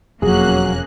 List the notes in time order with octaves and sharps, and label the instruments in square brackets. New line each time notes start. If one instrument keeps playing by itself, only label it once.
[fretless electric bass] E1 F2 [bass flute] F#3 [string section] A#3 C#4 F#6 [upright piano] G#4